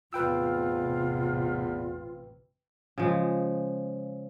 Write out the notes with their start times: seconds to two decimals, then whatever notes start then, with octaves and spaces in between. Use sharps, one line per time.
0.13 A1 E2 C3 F4 B4 G5 E6
2.98 C#3 F3 G#3